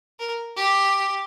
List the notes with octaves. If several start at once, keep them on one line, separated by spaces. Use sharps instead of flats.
A#4
G4